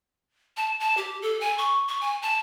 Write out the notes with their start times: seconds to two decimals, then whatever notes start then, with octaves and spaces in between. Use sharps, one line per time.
0.57 A5
0.80 A5
0.97 G4
1.22 A4
1.41 G#5
1.58 C#6
1.89 C#6
2.01 G#5
2.22 A5